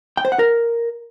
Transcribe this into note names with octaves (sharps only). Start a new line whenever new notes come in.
G5
C5
F#5
A#4